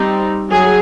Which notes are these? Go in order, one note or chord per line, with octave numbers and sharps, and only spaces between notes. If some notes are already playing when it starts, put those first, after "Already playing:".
Already playing: G3 C4 D#4
F#3 G#4